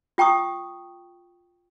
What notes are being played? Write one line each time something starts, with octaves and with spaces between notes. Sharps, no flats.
F4 G5 A#5 C#6 D#6